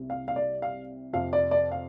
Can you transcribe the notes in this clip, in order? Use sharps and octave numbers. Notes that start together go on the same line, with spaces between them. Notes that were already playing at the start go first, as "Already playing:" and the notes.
Already playing: C2 C3 G3
F5
F5
D5
F5
F2 C3 F3 F5
D5
D5
F5